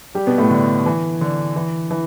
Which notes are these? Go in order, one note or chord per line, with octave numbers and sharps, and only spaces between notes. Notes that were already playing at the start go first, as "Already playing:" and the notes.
G3 G4
B2 B3
A2 A3
D3
E3
D3
E3
E3